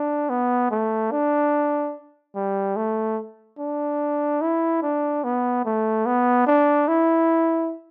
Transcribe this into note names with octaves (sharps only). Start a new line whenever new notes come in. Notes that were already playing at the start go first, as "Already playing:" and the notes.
Already playing: D4
B3
A3
D4
G3
A3
D4
E4
D4
B3
A3
B3
D4
E4